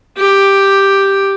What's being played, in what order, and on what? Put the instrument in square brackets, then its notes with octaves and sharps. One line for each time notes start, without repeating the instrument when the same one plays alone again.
[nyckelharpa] G4